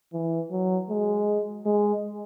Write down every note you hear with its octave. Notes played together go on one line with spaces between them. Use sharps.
E3
F#3
G#3
G#3